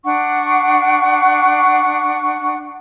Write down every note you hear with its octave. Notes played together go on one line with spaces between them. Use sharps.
D4 F#5 C#6